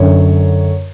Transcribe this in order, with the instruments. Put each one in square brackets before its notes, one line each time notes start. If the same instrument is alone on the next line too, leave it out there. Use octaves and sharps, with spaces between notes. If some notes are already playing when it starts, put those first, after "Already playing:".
Already playing: [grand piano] F#2 D3 C#5